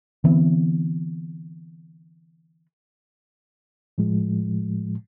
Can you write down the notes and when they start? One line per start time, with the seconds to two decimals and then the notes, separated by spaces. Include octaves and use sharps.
0.24 D3 E3 B3 C4
3.98 A2 F3 G#3